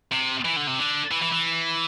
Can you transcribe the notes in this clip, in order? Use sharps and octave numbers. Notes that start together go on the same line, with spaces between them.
C3
E3
D3
C3
D3
E3
E3
E3